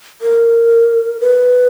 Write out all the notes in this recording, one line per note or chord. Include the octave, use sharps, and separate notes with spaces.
A#4
B4